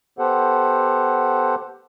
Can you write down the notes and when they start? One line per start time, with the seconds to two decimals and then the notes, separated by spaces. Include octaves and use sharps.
0.19 B3 G4 A4 C5 F#5